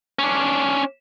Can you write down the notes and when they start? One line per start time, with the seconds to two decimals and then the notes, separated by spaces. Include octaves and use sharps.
0.19 C#4 D4